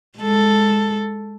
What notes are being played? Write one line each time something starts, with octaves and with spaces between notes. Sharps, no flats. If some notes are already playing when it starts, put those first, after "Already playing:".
G#3 A4